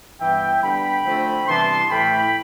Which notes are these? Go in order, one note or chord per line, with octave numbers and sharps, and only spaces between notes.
G2 E3 B3 E5 G5
D3 G3 B3 G5 B5
D3 F3 A3 C4 E4
C3 E3 G3 B3 D4 A5 C6
A2 E3 A3 E4 G5 B5